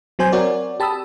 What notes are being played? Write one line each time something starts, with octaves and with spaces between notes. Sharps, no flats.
F#3 C4 C5 G#5 G6
C4 F#4 A#4 C#5 D5
G4 A5 B5 D#6 E6